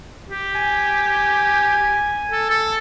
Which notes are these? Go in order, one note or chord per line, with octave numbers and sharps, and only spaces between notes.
G4
G#5
A4
A4